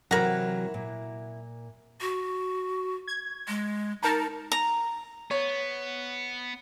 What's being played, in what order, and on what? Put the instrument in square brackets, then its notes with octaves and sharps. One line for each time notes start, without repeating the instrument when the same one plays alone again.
[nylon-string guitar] C3 E3 F#3 [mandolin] E4 F#5 [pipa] A#4 A#5
[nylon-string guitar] A#2
[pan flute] F#4
[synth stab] G#6
[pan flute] G#3
[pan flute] D#4 [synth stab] A#4 A5 A#5
[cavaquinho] A#5
[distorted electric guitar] B3 [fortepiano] C#5